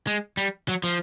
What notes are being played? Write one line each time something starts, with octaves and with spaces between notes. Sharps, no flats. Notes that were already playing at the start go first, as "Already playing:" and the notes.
G#3
G3
F#3
F3